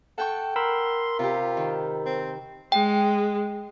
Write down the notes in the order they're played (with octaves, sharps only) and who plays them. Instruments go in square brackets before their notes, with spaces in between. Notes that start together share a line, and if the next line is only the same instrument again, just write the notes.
[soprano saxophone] A4 [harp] F#5 G5 C#6
[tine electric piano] A#4 B5 E6 [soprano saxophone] C6
[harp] C3 G4 [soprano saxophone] F4
[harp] D#3
[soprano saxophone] C4
[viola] G#3 [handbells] G5